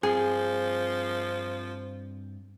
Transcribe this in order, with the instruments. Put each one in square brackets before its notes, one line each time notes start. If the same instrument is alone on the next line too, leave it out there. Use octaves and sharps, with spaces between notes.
[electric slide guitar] G2 C4 [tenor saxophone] F3 [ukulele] G#4